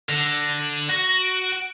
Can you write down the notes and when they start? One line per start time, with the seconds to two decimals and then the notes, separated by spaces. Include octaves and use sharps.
0.09 D3 A#6
0.59 F#7
0.89 F#4 A#6
1.21 D7